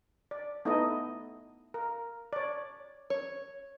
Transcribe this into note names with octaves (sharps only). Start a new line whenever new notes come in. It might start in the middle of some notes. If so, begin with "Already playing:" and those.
D5
A3 B3 D#4 E4 A4 D#5
A#4
C#5 D5
C#5